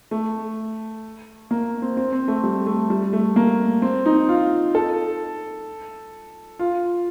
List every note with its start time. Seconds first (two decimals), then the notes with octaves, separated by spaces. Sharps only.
0.11 A3
1.51 A#3
1.82 C4
1.97 C4
2.12 C4
2.28 A3
2.44 G3
2.67 A3
2.90 G3
3.13 A3
3.36 A#3
3.82 C4
4.06 D#4
4.29 F4
4.75 A4
6.59 F4